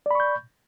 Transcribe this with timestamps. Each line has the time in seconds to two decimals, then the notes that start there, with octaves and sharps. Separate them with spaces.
0.06 D5
0.11 B5
0.15 C#6
0.20 G6